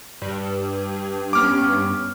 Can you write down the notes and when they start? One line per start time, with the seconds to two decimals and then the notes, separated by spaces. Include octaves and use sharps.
0.22 G2
1.33 B3 C#4 D6 F6